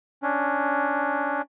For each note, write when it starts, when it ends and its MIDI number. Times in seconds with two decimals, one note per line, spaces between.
0.23 1.42 61
0.23 1.42 62